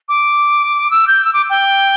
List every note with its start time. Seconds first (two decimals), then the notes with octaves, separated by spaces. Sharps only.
0.09 D6
0.91 E6
1.08 G6
1.25 E6
1.33 D6
1.50 G5